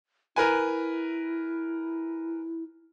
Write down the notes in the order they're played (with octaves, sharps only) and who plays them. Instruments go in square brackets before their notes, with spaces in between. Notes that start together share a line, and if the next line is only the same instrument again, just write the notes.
[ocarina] E4 [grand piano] A#4 B4 G#5